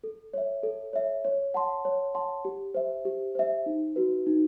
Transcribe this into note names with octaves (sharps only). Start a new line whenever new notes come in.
A4
C#5 E5
A4
C#5 E5
C#5
F#5 A5 C6
C#5
F#5 A5 C6
G4
C5 E5
G4
C5 E5
D#4
F#4 B4
D#4